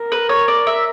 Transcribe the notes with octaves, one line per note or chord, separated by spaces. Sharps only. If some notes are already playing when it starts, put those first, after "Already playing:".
Already playing: A#4
B4
C#5
D5
E5